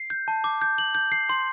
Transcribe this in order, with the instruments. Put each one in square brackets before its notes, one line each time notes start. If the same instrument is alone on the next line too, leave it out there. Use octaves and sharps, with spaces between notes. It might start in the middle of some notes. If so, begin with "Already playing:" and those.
Already playing: [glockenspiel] C7
G6
A5
D6
G6
F#7
G6
C7
C6